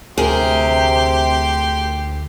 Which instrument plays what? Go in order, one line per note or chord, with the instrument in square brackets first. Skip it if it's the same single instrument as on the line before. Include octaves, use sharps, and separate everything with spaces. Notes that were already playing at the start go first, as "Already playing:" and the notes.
[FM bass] D2 [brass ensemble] C3 [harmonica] G4 C6 [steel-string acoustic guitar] G#4 A#4